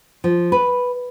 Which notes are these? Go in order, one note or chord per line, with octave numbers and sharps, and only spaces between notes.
F3
B4